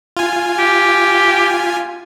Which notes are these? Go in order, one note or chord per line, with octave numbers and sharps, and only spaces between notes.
F4 G#5
G4